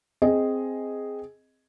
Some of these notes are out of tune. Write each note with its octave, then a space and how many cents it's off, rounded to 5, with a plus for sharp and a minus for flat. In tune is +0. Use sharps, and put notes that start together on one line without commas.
C4 +0 G#4 +0 D#5 +0